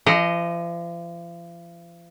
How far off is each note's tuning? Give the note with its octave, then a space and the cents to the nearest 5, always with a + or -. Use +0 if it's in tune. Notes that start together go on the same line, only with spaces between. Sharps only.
F3 -40 D#5 +0